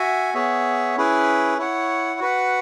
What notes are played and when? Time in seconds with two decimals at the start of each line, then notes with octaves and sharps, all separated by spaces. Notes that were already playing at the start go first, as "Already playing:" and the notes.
Already playing: F#4 E5 G#5
0.34 B3 G#4 C#5 E5
0.97 C#4 E4 G#4 B4
1.58 E4 C#5 F#5
2.20 F#4 B4 F#5